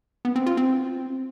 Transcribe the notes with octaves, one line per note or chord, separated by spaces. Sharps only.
B3
C4
F4
C4